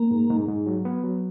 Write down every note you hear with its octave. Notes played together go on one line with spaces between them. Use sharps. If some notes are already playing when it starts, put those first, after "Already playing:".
Already playing: A#3
G#2
G#2
G#2
F#3
B3
F#3